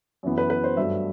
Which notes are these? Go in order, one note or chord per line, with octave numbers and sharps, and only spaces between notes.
F#2 E3 B3
B4
B4
C5
G2 F#3 A3 E5